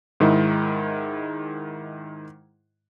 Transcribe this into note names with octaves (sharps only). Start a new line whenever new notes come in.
G#2 D#3 G#3 E4